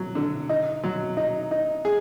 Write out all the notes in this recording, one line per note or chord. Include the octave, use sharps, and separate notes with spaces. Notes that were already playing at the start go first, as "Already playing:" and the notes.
Already playing: F#3
D3
D#4
F#3
D#4
D#4
G#4